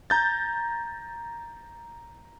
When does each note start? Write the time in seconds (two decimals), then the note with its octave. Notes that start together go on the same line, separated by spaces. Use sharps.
0.10 A#5 G6 A6